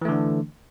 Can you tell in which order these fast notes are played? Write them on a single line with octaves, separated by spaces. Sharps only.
E3 A3 D3 D4